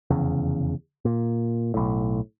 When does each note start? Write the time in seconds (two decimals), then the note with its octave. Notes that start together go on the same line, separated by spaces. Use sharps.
0.10 F1 E2 C#3
1.05 A#2
1.74 B1 A2